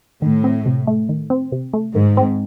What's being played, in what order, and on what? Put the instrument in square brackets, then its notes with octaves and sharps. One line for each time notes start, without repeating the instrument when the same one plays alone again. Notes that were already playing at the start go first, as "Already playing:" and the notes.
[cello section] A2 [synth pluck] D#3
[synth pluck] C4
C3
A3
D#3
C4
C3
A3
[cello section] G#2 [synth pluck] D#3
[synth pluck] C4